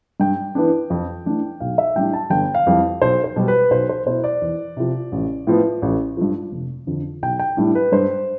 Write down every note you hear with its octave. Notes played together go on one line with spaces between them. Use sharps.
G2 G5
E3 B3 D4
F2
E3 A3 D4
B1 F5
E5
A2 G3 D4 G5
A5
G1 G5
F5
F2 E3 G3 C4
B1 C5
C5
B2 G3
B4
B1 C5
C5
B2 B3 E4 C5
D5
E2
C3 F3
A1
A2 F3 B3
A1
G2 F3
F1
F2 D3 F3
B1 G5
G5
A2 G3 D4
B4
G2 C5